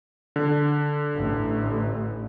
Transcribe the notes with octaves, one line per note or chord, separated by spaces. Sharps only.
D3
A1